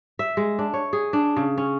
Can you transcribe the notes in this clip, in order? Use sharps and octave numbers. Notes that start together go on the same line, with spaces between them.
E5
G#3
D4
C#5
G#4
D4
C#3
C#4